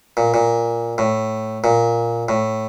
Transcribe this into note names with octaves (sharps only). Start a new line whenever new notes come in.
A#2
A#2
A2
A#2
A2